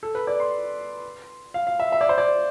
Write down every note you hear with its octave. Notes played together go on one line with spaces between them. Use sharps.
A4
B4
D5
C6
F5
F5
E5
E5
D5
C5
D5